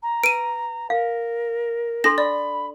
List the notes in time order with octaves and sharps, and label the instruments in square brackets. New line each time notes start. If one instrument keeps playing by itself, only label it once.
[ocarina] A#5
[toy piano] B4 [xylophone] D7 D#7
[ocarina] A#4 [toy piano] F5
[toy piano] D4 A4 C6 [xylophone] A#6
[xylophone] D5 [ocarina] B5